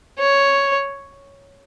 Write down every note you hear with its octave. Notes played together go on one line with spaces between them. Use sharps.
C#5